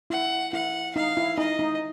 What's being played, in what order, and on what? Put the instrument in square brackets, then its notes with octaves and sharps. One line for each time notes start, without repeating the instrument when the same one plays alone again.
[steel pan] E4 [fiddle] F#5
[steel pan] E4 [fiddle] F#5
[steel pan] D#4 [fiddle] F5
[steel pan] E4
[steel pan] D#4 [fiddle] D#5
[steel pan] D#4